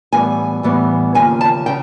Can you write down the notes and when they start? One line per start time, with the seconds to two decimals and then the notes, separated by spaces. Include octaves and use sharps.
0.13 A2 E3 G3 B3 G#5
0.63 A2 E3 G3 B3
1.15 D#2 C#3 F3 G#5
1.41 A5
1.66 C#3 G5